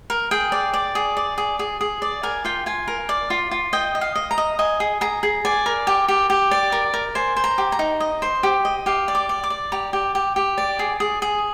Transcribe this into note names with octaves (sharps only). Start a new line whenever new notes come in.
A#4
G#4 G5
D5
D5
G#4
D5
G#4
G#4
G#4
D5
A#4 G#5
F4 G5
F4 G#5
A#4
D5
F4
F4
D#5 G5
D#5
F5
D#5
A#5
D#5
D#5 G#5
G#4
G#4 A#5
G#4
D5 G#5
A#4
G4
G4
G4
D5
A#4
A#4
C5 G#5
C5
A#5
G4
A#5
D#4
D#5
C5
G4
D#5
G4 F5
D5
D6
D5
D6
D5
G4 A#5
G4
G4
G4
D5
G#4
G#4
G#4